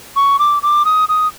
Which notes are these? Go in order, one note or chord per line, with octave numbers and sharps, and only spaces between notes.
C#6
D6
D6
D#6
D#6